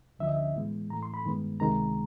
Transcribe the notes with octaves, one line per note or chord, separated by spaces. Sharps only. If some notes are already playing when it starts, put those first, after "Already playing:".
D2 D3 F3 E5
D#5
E5
A2 E3 G#3 B3
A2 E3 A3 A#5
C6
B5
G2 D#3 G#3 B3
C#2 C3 D#3 G#3 A#5